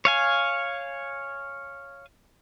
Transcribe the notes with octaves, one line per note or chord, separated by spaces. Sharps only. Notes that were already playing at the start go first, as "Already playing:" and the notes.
C#5 F5 G#5